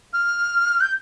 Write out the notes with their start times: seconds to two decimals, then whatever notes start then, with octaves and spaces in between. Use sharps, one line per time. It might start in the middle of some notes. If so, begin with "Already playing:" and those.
0.13 F6
0.80 G6